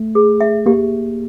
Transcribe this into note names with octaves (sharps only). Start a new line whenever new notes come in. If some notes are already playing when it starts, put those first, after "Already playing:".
Already playing: A3
G#4
E5
A#3 G4